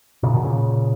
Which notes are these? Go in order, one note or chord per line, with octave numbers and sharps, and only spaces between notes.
A#2 C#3
B2 D#3
A#2 C#3